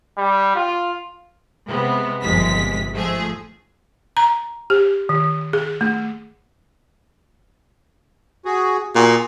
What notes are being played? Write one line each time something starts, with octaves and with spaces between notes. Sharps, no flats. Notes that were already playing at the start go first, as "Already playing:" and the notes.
G3
F4
C3 G#3 B3
G1 D#2 C3 F3 G#3 B6
G#2 F3 A3 G#4
A#5
G4
D#3
G#4
A3
F#4 G#4
A#2 F#4 G#4